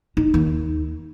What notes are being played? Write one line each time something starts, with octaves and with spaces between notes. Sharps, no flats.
D#4
D#2